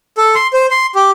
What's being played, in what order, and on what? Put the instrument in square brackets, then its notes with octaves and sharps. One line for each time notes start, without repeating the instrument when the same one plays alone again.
[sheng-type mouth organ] A4
C6
C5
C6
G4